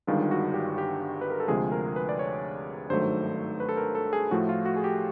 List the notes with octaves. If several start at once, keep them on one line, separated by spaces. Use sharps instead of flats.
G1 G2 D#3 G#3 F4
F#4
G4
G4
B4
A#4
A4
D2 C3 F3 G#3 G#4
A#4
B4
D5
C#5
G#1 G2 D#3 F#3 A3 C5
B4
A4
A#4
A4
G#4
A2 F3 A3 F#4
F4
F#4
G#4
G4